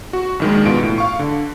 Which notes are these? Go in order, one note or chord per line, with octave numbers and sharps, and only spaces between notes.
F#4
A#1 D#3 G#3
A#1 B2 F4 D7
A2
F5 C#6
D3